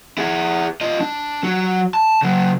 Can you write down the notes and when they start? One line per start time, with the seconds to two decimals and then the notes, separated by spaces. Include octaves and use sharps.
0.18 E4 G#4
0.81 F4 D#5
1.01 D4
1.43 F#3 F#4
1.94 A5
2.22 C#3 F#3